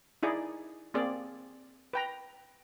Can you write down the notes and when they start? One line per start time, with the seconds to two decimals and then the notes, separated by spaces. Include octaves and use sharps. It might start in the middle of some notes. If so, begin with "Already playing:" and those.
0.23 D#4 E4 G#4 D5
0.94 A#3 C4 G#4 D5
1.93 B4 G5 A#5